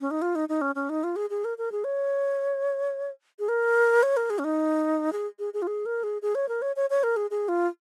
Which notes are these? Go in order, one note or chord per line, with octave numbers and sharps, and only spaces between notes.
C#4
D#4
F4
D#4
D#4
C#4
C#4
D#4
F4
G#4
G#4
A#4
A#4
G#4
C#5
G#4
A#4
C#5
A#4
G#4
C#4
D#4
G#4
G#4
G#4
F4
G#4
A#4
G#4
G#4
C#5
A#4
C#5
C#5
C#5
A#4
G#4
G#4
F4